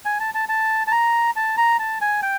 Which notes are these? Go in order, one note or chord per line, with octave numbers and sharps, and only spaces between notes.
G#5
A5
A5
A5
A5
A#5
A5
A#5
A5
G#5
G5